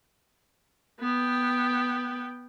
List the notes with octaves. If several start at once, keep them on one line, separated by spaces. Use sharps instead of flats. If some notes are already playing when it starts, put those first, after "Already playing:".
B3 G5